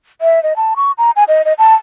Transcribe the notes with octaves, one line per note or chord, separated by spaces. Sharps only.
E5
D#5
A5
C#6
A#5
G#5
D#5
D#5
A5